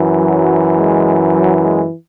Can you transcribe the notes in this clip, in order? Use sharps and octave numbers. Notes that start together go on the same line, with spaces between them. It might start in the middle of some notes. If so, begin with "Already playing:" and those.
Already playing: F#2 E3
F#3
G#3
F#3
G#3